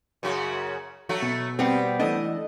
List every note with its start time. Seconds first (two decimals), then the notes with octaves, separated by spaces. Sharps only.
0.23 F#2 C#3 F#4
1.09 F#3 A3 F#4
1.22 B2
1.59 G3 B3 C4 G4
2.00 E3 A3 D4 D#5